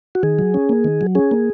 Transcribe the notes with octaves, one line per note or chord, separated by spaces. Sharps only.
F#4
D#3 G#4
F#3
C#4
A#3
D#3
F#3
C#4 G#4
A#3